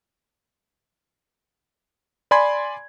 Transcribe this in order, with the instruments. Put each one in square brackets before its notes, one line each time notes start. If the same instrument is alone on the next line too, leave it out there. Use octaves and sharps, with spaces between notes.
[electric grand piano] D5 G#5 B5 C6 G#6